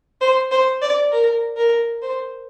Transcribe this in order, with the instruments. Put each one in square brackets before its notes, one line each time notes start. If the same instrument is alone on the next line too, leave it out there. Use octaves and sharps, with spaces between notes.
[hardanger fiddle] C5
C5
D5
A#4
A#4
C5